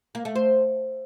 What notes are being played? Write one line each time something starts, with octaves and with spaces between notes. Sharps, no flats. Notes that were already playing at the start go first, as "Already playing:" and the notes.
A#3
A3
C5